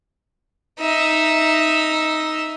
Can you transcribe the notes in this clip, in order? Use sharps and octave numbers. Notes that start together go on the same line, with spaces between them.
D#4 E5